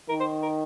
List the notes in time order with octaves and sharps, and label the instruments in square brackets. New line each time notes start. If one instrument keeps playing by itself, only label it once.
[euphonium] D#3 [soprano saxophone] A#4
[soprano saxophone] C5
A#4